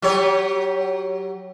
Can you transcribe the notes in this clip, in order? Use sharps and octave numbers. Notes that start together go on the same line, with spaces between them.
F#3 G4 C#5